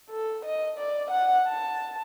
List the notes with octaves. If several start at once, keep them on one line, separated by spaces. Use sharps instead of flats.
A4
D#5
D5
F#5
A5